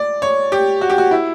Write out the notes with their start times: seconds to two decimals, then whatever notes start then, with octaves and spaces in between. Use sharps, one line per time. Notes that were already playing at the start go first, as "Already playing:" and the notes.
Already playing: D5
0.22 C#5
0.52 G4
0.81 F#4
0.90 G4
0.98 F#4
1.11 E4